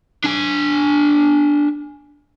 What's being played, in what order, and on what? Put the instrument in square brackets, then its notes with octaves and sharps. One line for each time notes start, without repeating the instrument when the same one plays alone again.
[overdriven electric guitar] D4 G#5